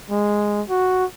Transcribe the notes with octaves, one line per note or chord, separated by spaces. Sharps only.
G#3
F#4